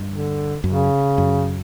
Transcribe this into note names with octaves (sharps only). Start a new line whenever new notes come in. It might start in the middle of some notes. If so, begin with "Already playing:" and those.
Already playing: G2
D3
F#2 C#3
F#2